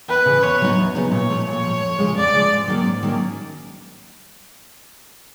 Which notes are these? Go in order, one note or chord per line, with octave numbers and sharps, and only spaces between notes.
E2 B4
C#3 E3
E2 C#5
C#3 F#3 B3 D#4
E2
C#3 F#3 B3 D#4
A#2 C#5
F3 A3
A#2 C#5
F3 A3
F2
C#3 F3 G#3
F2 D5
C#3 F3 G#3
G#2
D#3 F#3 A#3 C#4
G#2
D#3 F#3 A#3 C#4